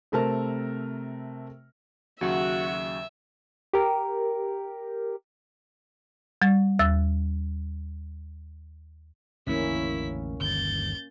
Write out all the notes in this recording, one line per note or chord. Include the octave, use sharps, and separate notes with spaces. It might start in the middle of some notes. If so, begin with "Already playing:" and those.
C3 A3 C4 A#4 A5 F6
D#2 C#3 F#3 F#4 E5
G4 A#4
G3 A6
D#2 E6 A6
A1 E2 D3 A#3 C#4 E4 B6
G1 D#2 G6 A6